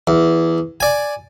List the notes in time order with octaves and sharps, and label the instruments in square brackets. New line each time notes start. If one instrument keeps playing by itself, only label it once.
[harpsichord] E2
D5 G#5